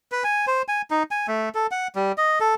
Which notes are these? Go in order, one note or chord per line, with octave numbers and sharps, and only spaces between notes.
B4
G#5
C5
G#5
D#4
G#5
A3
A4
F#5
G3
D#5
A4